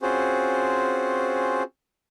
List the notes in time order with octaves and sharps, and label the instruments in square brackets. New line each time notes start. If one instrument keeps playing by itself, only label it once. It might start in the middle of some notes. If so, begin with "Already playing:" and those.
[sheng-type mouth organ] C4 C#4 F4 F#4 G#4 C5